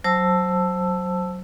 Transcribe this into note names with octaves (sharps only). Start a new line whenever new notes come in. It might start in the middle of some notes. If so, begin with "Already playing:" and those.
F#3 C5 A5 E6